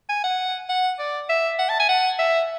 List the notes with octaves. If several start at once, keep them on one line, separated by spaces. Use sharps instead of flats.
G#5
F#5
F#5
D5
E5
F#5
A5
G#5
F#5
E5